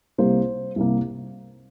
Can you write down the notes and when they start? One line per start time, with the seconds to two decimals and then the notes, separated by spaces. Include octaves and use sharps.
0.18 C2 C3 G3 A#3 C5
0.76 C2 C3 G3 A#3